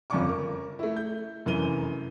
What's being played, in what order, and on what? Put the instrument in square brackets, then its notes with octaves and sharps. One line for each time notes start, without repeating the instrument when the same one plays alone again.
[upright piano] G1 F2 C#3 D5 C#6 D6
A#4
A3 E4
G6
F1 F#2 E3 A#4 D#7 G7